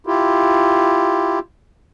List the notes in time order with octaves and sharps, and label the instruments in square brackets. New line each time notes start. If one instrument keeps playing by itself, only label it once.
[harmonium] E4 F4 G4